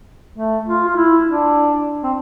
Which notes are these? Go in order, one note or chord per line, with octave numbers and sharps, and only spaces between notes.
A3
F4
F4
E4
D4
C4